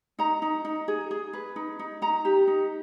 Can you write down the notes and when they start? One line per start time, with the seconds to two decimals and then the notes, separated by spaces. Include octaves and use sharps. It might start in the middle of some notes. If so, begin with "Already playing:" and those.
0.19 D#4 A#5
0.42 D#4
0.65 D#4
0.88 G#4
1.11 G#4
1.33 B4
1.56 D#4
1.79 D#4
2.02 D#4 A#5
2.25 G4
2.47 D#4